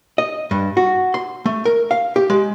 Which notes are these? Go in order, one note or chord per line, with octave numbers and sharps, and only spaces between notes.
D#5
G2
F#4
C6
A3
A#4
F5
G4
G#3